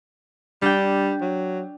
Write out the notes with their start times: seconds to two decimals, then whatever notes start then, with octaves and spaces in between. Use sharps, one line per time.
0.62 G3 D4 G5
1.21 F#3